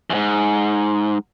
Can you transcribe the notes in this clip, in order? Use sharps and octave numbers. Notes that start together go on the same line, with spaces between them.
E2 G#2